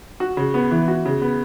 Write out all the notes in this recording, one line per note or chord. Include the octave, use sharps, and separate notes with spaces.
F#4
C#3
B3
E3
F#4
C#3
B3